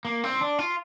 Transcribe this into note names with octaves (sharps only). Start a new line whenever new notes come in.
A#3
C4
D4
F4